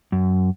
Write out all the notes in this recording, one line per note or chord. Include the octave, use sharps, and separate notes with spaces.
F#2